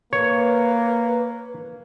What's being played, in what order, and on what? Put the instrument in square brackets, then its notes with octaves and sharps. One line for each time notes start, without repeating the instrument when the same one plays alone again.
[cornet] A#3 [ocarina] B4 [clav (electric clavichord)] C#5